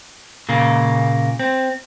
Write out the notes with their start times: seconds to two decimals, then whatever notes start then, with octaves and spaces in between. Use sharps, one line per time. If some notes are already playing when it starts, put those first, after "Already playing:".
0.49 A#2 C#3 A#3
1.39 C4